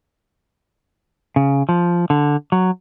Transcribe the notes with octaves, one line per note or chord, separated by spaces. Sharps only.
C#3
F3
D3
F#3